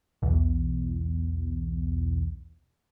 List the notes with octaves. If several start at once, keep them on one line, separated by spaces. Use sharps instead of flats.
B1 E2